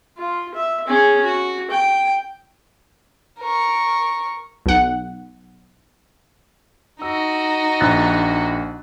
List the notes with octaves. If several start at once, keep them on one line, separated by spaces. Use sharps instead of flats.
F4
E5
C#4 G#4
F#4
G5
A#4 C#6
B1 F#5
D#4 F#4 E6
A#1 F#6 A6